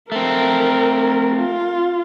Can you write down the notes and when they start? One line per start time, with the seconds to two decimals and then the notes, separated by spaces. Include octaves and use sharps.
0.12 A3 C4 A#4
1.36 F4